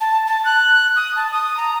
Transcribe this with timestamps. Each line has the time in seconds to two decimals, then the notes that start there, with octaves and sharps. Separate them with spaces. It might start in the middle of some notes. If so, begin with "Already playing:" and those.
0.01 A5
0.27 A5
0.45 F#6
0.96 D#6
1.16 A5
1.32 D#6
1.57 A#5